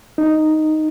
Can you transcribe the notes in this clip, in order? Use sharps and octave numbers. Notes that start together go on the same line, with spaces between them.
D#4